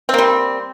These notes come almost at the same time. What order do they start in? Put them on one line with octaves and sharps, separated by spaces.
C4 A#3 G3